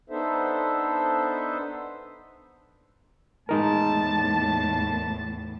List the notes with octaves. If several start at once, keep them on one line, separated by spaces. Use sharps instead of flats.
B3 D4 D#4 A4 C5 E5
E2 A2 G#3 D#4 A#4 A5